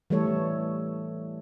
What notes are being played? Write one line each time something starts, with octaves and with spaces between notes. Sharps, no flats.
E3 G3 A3 A4 C#5